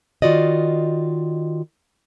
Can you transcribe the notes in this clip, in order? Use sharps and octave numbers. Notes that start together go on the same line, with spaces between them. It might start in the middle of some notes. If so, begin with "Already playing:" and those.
D#3 F4 F#4 D5 D#5